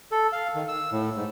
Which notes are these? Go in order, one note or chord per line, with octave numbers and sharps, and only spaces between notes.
A4
F5
D#3
E6
A2
G#2